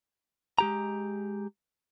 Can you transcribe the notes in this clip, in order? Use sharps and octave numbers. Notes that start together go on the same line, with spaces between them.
G#3 G4 A#5